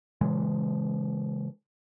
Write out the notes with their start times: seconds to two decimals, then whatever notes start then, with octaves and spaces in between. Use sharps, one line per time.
0.21 A#2 C#3 E3 G#3